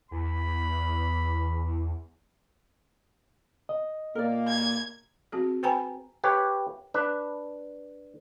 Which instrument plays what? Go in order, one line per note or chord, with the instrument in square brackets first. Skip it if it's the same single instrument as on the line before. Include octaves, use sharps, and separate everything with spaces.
[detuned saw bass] E2 [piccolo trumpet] B5
[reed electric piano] D#5
[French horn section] A#2 A#3 [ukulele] A#4 D5
[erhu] G#6
[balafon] C4 F#4 G#4
B4 C5 G5 G#5 A#5 B5
[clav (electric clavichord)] G4 B4 C#5
D4 B4